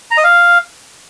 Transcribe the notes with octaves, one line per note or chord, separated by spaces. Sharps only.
A#5
D#5
F5